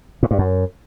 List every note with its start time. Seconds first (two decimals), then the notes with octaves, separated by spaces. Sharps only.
0.23 G#2
0.31 G2
0.39 F#2